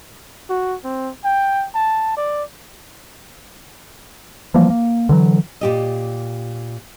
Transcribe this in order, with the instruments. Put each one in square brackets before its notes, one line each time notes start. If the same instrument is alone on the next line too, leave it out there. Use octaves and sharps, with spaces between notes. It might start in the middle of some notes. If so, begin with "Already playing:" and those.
[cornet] F#4
C4
G5
A5
D5
[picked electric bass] E3 F3 G3 A#3
A#3
D3 E3 F#3
[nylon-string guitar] A#2 G4 D#5